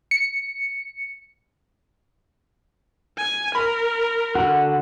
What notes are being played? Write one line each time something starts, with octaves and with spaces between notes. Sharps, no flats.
C#7
G#5
A#4 B5
D3 F#4